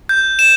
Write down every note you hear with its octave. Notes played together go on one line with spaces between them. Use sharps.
G6
E7